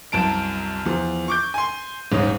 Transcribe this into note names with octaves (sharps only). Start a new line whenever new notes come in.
C2 F#2 A5 D7
E2 F3
C#6 D6 G6
G#5 C6
D#1 G#2 C#4 D#6